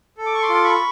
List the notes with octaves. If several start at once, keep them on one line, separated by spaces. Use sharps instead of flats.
A4
D6
C#6
C6 D6
F4
D6
B5 C#6